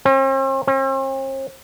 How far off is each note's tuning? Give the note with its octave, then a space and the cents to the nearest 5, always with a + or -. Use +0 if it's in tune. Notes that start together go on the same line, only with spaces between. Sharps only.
C4 +45
C4 +45